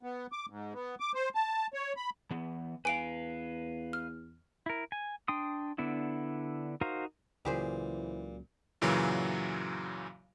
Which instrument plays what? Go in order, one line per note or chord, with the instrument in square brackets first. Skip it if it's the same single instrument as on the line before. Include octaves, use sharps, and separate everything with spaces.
[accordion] B3
D6
G#2
B3
D6
C5
A5
C#5
B5
[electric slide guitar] E3 B3
[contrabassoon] E2 [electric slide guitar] B4 F5 [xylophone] G#5 D7
[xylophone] F6
[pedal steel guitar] E4 A#4
G#5
D4 G5 C6 D#6
D3 B3 D4 E4
D#4 F#4 A#4 C5 F5
[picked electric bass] C#2 C#3 F#3 [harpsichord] A#2 [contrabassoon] E3 [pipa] G4 G#4 C5
[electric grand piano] F#2 A#2 C#3 E3 F#3